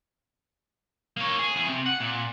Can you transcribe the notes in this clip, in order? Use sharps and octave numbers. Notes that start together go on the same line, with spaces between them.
A#3 C#5
G#4
E2 G#4
C3
F#5
A#2